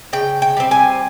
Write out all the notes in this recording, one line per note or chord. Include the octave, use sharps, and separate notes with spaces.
C#3 G5
G5
G3 C4
G#5